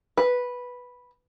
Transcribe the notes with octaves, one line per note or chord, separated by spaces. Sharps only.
B4